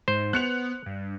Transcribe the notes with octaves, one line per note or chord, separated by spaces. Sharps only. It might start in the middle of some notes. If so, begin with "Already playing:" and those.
G#2 C5
B3 F#6 C#7 F7
G2